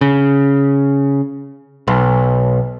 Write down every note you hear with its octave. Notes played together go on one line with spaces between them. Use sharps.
C#3
B1